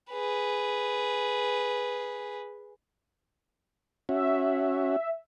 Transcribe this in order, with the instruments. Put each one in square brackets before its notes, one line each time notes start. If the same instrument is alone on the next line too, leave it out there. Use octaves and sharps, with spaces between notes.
[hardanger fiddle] G#4 B4
[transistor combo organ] C#4 F#4 [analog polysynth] E5